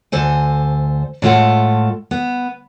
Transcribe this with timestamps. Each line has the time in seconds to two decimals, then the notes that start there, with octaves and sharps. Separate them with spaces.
0.12 D2 A4 C5 G#5
1.22 A2 G#3 A3 F4 A4 F#5
2.11 B3